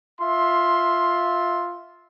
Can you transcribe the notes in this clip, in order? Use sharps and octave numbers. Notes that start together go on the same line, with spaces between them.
F4 E5 C6